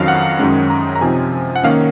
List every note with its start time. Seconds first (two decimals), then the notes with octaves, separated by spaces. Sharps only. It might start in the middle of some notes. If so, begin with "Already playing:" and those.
Already playing: F2 D#3 F#3 C#4 F5
0.08 F#5
0.39 F#2 D#3 G#3 C#4
0.70 A#5
0.96 A#5
1.01 C3 F3 C4 D#4 G#5
1.56 F#5
1.63 D#3 A#3 C#4 F5